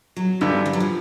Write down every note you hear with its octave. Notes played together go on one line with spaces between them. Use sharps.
F#3
G2 D3 E3 G3
F3
F#3
F3